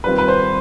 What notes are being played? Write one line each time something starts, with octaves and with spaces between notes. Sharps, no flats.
D#3 G3 C4 F4 B4
B4
C5